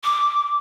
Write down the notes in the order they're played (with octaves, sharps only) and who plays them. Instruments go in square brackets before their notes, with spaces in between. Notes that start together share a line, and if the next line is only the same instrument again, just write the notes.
[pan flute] D6